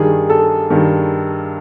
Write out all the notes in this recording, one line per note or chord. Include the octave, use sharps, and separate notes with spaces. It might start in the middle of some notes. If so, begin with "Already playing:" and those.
Already playing: G2 D#3 G#4
A4
G2 D#3